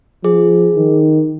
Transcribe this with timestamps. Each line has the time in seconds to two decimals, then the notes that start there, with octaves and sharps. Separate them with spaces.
0.24 F3 G#4
0.76 D#3